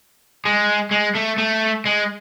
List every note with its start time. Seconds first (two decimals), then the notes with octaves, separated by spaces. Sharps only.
0.45 G#3
0.91 G#3
1.15 A3
1.38 A3
1.86 G#3